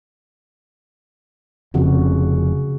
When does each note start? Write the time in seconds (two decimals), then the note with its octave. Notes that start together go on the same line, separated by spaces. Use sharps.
1.74 F1 F2 C#3 F#4